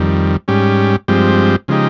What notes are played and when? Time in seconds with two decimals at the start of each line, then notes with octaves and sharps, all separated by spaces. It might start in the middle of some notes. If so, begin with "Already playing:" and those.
Already playing: F2 D#3 G3
0.48 G#2 G3 C#4 G4
1.08 G2 F3 G#3 C4 G4
1.68 C#3 F3 G#3 D#4 G4